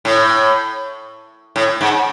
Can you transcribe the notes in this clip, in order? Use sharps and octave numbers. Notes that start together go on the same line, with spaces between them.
A2
A2
G#2